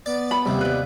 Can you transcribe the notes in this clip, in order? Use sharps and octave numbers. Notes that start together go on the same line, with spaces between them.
B3 D5 A6
B5
D#2 C3 G3
B4 D5